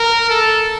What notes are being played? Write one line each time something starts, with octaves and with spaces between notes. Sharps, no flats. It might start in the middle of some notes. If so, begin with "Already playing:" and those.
Already playing: A#4
A4